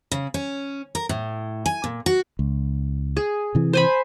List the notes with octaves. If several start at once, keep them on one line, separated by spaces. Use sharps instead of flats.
C#3
C#4
A#4
A2
G#5
A#2
F#4
C#2
G#4
C3 E3
C5 G#5 B5